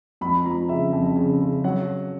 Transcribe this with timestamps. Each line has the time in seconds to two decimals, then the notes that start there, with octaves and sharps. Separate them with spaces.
0.21 F2 B5
0.45 F3 A#5
0.69 C#3 E5
0.92 F2
1.16 C#3
1.40 C#3
1.64 F#3 F#5